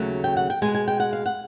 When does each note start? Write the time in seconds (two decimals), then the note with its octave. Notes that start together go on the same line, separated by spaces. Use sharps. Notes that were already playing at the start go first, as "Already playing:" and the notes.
Already playing: D#2 C#3 F#3 A3
0.24 G5
0.37 F#5
0.50 G5
0.62 B2 G#3 G#5
0.75 G#5
0.88 G5
1.00 F#5
1.13 F5
1.26 F#5